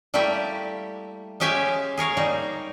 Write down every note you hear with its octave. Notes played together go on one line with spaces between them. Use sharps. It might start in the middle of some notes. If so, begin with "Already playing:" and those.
G3 A3 A#3 E4 G4 E5
G#3 C#4 G4 E5 F5 G#5
G#4 A#4 C#5 F5
G3 A#3 D#4